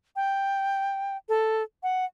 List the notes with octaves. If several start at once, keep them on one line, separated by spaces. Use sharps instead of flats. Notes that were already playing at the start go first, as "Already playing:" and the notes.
G5
A4
F#5